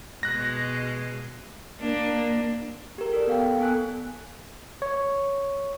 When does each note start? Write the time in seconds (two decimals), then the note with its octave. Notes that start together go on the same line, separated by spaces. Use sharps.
0.23 B2 G#3 F#6 A#6
1.80 A#3 D4
2.98 G4 A#4
3.13 A4 D5
3.27 B3 F5 G5
3.60 B3 A4 G#5 F#6
4.82 C#5